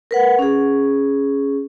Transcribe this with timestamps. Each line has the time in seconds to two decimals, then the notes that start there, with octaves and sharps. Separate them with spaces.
0.11 A#4 B4 F#5
0.39 C#4 G#4